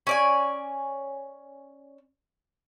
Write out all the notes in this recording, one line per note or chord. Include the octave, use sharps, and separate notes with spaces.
C#4 D5 G#5